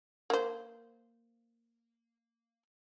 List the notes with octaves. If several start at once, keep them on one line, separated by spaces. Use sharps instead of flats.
A#3 C5